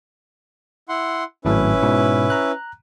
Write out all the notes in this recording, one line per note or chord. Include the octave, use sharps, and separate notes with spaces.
E4 F#5 C6
G#1 A2 F#3 C#4 E4 B4
G#2 B2
A#5 F#6